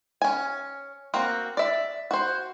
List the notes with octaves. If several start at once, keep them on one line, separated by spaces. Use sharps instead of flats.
C#4 G#5
A#3 C4 F#4
D5 E5
F#4 C5